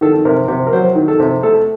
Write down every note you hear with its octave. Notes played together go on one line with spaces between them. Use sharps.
D#3 A4
C3 A#4
C3
A#4
F#3 C5
D#3
A4
C3
A3 A4